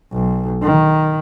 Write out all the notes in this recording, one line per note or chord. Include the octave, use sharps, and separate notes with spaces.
B1
D#3